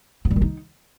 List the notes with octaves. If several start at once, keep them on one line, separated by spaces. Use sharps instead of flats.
B3
G3
D#3
D#4